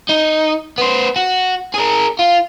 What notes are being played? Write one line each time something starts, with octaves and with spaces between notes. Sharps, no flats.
D#4
B3 C5
F#4
G#4 A#4
F4